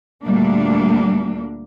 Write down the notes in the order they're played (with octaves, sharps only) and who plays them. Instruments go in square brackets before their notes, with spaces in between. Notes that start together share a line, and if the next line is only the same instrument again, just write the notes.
[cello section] D2 A#2 G3 A#3 D4